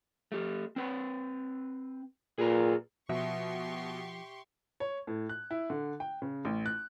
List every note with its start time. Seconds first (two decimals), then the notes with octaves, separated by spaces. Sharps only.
0.32 A3 G4
0.76 C4 B4
2.38 A#2 G#4 B4 A#5
3.09 B2 F3 G4 E5 C6 C#6
4.80 C#5
5.07 A2
5.29 F#6
5.51 E4
5.70 D3
6.00 G5
6.22 C#3
6.45 A1
6.66 F#6